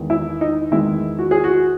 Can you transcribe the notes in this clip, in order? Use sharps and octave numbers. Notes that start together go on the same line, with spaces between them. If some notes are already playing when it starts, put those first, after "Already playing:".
Already playing: E2 D#3 G#3
E4
D#4
E2 D#3 G#3 E4
F#4
G#4
F#4